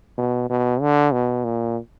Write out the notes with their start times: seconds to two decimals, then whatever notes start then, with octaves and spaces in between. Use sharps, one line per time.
0.17 B2
0.50 B2
0.81 D3
1.13 B2
1.44 A#2